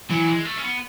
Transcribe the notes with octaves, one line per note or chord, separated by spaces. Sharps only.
E3 F#3
G#3
A3
C#4
B3